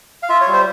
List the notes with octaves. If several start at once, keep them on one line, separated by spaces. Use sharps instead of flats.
F5
F4 E5
C#5
G3
C5